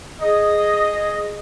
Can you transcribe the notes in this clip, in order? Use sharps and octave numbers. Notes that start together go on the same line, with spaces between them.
G#4 D#5